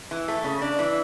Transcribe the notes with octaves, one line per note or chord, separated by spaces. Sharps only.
E3
A3
C#3
D4
E3